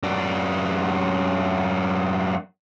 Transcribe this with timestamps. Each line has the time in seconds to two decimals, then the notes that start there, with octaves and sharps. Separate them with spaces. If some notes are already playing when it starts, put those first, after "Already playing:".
0.03 F#2 D4